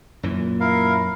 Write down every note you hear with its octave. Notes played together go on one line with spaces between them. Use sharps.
F#2 A#2 E3
E4 A#4 F5